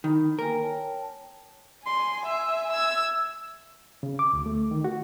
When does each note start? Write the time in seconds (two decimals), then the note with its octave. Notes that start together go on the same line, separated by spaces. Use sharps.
0.04 D#3 B5
0.39 A#3 A#4 G5 G#5
0.61 C#5 G5 A5
1.86 G#5 C6
2.26 E5
2.73 E6 G#6
4.03 C#3
4.19 D6
4.33 D2
4.46 A3
4.71 D#3
4.84 F#4